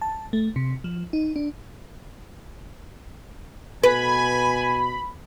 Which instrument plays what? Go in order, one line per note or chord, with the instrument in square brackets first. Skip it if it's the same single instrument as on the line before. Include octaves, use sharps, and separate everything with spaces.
[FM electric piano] A5
A3
C3
F3
D#4
D4
[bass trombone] B2 [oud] B4 [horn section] G#5 [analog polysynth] B5